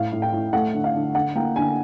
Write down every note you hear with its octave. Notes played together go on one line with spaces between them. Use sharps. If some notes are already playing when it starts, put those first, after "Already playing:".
Already playing: A2 F5
A2
G5
A2
A3 F#5
D3
F5
D3
D3 F#5
A#3 G5
D3 G#5